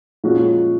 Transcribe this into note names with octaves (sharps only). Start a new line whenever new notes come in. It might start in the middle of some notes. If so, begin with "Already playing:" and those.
A#2 F3 G#3 C#4 F#4